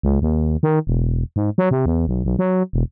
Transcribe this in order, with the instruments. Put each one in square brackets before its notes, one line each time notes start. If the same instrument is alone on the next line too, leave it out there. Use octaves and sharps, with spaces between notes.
[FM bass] C#2
D#2
D#3
E1
G#2
F#3
C3
E2
B1
B1
F#3
E1